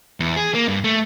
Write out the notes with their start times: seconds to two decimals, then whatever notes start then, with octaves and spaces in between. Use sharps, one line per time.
0.20 E2
0.36 G#4
0.55 A#3
0.68 G2
0.84 A3